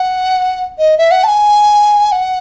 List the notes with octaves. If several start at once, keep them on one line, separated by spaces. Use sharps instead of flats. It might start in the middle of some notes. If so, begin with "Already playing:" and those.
Already playing: F#5
D#5
E5
F#5
A5
G#5
F#5